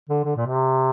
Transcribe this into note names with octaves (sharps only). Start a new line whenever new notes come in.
D3
D3
A#2
C3